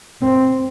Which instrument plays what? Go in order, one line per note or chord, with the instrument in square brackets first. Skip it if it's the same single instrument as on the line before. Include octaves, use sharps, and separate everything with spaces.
[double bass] C4